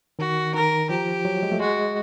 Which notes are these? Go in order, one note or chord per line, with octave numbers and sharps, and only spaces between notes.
D#3 F#4
D#3 A#4
F3 G4
F#3
G#3
A3
G#3 F#4